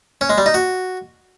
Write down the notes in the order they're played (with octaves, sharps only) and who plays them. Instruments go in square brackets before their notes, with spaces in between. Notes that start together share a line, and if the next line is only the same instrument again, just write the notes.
[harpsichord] C#4
G#3
G3
D#4
F#4